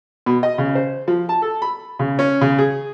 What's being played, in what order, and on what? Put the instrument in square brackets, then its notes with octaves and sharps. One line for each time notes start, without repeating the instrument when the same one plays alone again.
[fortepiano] B2
D#5
C#3
C5
F3
A5
A4
B5
C#3
C#4
C#3
G#4